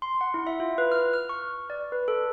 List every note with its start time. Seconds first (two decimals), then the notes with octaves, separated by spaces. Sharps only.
0.02 C6
0.21 F#5
0.34 E4
0.47 E5
0.60 F4
0.78 B4
0.92 F6
1.13 F6
1.29 C#6
1.70 D5
1.92 B4
2.08 A4